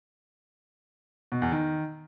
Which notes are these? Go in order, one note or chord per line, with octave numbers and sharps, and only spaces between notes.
B2
E2
D#3